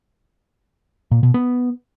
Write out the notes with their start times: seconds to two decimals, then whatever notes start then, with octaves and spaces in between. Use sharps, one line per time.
1.11 A#2
1.23 B2
1.34 B3